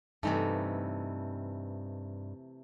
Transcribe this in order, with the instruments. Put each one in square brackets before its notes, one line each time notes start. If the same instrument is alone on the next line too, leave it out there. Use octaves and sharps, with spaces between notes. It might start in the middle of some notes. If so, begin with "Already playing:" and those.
[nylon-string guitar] G2 D#4 [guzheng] C3 E3 A3